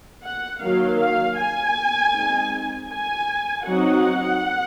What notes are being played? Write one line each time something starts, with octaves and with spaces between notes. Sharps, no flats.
F#5
D#3 F#3 A#3 F5
F5
G#5
G#3 C4 D#4
G#5
F#3 C4 D#4 F#5